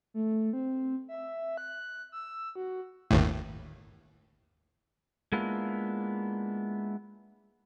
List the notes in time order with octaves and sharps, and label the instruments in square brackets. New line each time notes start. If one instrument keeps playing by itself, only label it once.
[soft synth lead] A3
C4
E5
F#6
E6
F#4
[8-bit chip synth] G1 D#2 A2
[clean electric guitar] G#3 A#3 B3 D4 E4 F4